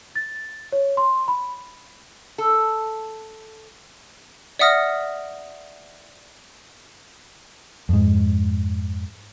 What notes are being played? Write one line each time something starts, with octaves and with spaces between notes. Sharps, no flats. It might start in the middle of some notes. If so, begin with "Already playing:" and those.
A6
C#5
C6
B5
A4
D5 E5 F#5 D#6 F6 A#6
F2 G#2